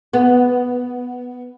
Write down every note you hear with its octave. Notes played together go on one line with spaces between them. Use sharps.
B3